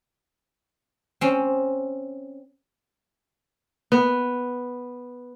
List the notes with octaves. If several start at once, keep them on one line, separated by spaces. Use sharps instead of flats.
C4 C#4
B3